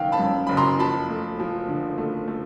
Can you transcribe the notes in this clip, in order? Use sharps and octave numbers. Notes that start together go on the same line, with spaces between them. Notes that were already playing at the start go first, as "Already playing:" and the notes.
Already playing: F#1 F#2 D#3 F5 G5
A5 B5
F#2
F#1 B5
A#5 C6
F3 A5 B5
A3
F3
D3
A3
A3